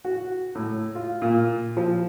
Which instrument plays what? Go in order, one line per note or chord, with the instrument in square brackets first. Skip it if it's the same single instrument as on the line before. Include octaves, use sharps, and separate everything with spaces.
[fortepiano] F#4
A2
F4
A#2
F3